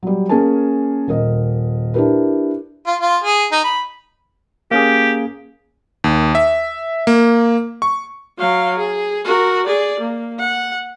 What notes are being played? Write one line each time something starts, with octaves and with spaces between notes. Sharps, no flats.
F#3 G3
A#3 C#4 G#4 A#4 G#5 A5
D#1 A#4 D#5
D4 E4 G4 A#4 B4
F4
F4
G#4
D#4
B5
A#3 C#4 G4 G#4
D#2
E5
A#3
C#6
F#3 F5
G#4
F#4 A#4
G#4 D5
A#3
F#5